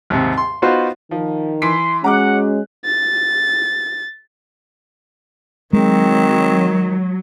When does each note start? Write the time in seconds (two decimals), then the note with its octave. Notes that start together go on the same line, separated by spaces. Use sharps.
0.10 D#2 G#2 C3
0.38 C6
0.62 B3 D#4 F4 F#4 C5
1.11 D#3 F3
1.62 E3 C6 B6 D7
2.04 G#3 C#4 F#4 F#5 A#5 D6 F#6
2.85 A6
5.73 D#3 F#3 G#3 C4